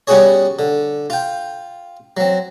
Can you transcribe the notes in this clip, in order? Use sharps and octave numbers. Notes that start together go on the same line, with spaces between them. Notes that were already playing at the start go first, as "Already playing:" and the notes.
G3 B3 C#4 F#4 G#4 C#5
D3
F4 G5
F#3 C4